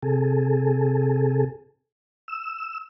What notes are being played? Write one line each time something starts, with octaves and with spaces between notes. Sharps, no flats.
C3 G#4 A4
E6